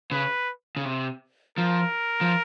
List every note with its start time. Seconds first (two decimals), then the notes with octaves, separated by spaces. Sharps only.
0.12 C#3 B4
0.77 C#3
0.85 C3
1.58 F3 A#4
2.21 F3